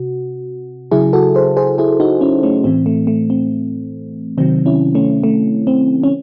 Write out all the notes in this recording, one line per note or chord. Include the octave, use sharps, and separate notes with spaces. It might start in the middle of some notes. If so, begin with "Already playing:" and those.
Already playing: C3 F#4
C#3 F#3 E4 G#4
F#4 A4
G#4 C5
G#4 C5
E4 G#4
D#4 F#4
C#4 E4
A3 C#4
A2 E3 C4
A3
A3
C4
C3 D#3 F#3 C4
C#4 E4
A3 C#4
A3
C4
C#4